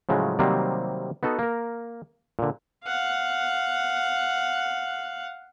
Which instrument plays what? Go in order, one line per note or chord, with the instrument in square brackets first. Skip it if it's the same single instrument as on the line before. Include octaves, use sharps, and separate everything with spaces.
[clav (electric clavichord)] A2 C#3 F3 F#3 G#3
C3 D#3 F#3 G3 A#3 C4
B3 D#4 F#4 A4
A#3 A#4
A#2 D3
[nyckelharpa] F5 F#5